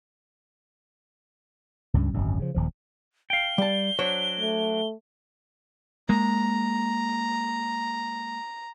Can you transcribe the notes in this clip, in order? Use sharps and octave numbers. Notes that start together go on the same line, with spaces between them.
C#2 G2 G#3 C#4
D1 G#1 F#2
C#3 F3
D#1 D#2 F3
F5 G5 G7
G3 A5
F#3 D4 C5 C#5
A3
G#3 A#3 A#5